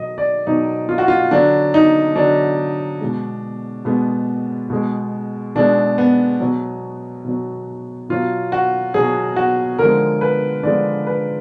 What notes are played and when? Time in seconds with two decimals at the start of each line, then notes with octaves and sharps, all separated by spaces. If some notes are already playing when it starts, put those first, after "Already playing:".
Already playing: B2 F#3 D#5
0.18 D5
0.47 B2 F#3 D#4
0.89 F4
0.98 F#4
1.08 F4
1.31 D3 F#3 D4
1.74 D#4
2.16 D3 F#3 D4
3.01 B2 G#3
3.85 B2 G#3 B3
4.70 B2 G#3
5.55 B2 G#3 D4
5.98 B3
6.40 B2 F#3
7.25 B2 F#3
8.09 B2 F#3 F4
8.52 F#4
8.94 B2 F#3 G#4
9.36 F#4
9.79 D3 F3 G#3 A#4
10.21 B4
10.63 D3 F3 G#3 D5
11.07 B4